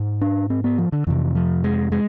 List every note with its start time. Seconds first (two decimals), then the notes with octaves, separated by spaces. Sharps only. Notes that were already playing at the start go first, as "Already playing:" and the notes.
Already playing: G#2
0.21 D4
0.50 C4
0.64 B3
0.78 F3
0.92 D3
1.07 F2 C3 E3
1.35 F3
1.64 G#3
1.92 G#3